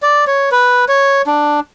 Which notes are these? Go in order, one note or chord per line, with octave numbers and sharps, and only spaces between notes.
D5
C#5
B4
C#5
D4